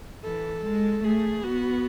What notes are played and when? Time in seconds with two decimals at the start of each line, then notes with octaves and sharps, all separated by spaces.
0.24 E3 A4
0.64 G#3
1.04 A3 G#4
1.43 B3 F#4